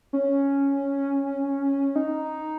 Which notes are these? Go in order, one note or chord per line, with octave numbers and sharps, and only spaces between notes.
C#4
D#4